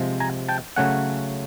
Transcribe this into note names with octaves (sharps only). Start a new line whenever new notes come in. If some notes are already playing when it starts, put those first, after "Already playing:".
Already playing: C3 F3 G#3
G#5 A#5
G5 A5
C#3 F#3 A3 C#4 F#5 G#5